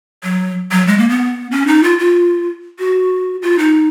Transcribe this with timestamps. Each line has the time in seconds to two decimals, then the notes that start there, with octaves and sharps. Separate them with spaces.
0.24 F#3
0.71 F#3
0.87 G#3
0.99 A#3
1.09 B3
1.52 C#4
1.67 D#4
1.84 F4
1.99 F4
2.79 F#4
3.42 F4
3.59 D#4